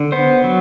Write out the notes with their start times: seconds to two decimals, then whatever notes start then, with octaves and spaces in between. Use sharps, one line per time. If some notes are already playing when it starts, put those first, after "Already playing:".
Already playing: D3
0.12 B3 C5
0.44 F#3